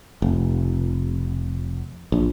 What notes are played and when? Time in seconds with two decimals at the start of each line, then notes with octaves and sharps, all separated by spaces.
0.22 F1
2.12 A#1